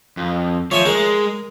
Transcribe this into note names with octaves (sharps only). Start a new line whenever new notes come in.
F2
F3 C#5 E5 G#5
G#3 A#4